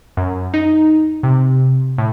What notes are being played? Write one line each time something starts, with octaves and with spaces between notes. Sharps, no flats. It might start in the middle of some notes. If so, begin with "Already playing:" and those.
F#2
D#4
C3
A2